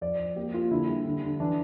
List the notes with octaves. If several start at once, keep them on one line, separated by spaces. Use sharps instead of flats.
F2 D5
F2
A#3 G4
A#3 F4
D3 E4
G3
D3
D3
E3 D4